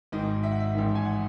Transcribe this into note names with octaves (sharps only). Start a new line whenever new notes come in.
G#1 G#2 D#3 D#5
E5
F#5
E5
A1 G#2 D#3
G#5
F#5